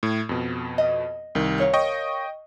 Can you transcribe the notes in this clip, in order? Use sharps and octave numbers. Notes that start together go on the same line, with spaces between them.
A2
F2 B2
D#5
C2 D#3
A#4 C#5 F5
D#5 G5 C#6